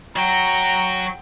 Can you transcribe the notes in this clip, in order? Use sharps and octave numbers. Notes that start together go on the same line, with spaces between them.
F#3 F#5 G5 A#5